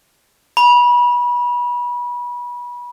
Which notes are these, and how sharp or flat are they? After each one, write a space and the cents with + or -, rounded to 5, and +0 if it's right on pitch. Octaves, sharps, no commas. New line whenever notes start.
B5 -25